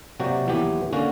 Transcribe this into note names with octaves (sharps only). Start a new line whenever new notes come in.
C3 F#3 A#3 F#4 D5 G5
D#2 E3 F#3 B3 G4
D3 A#3 C#4 F#4